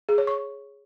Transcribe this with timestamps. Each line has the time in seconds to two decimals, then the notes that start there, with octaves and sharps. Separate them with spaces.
0.09 G#4
0.18 C#5
0.27 C#6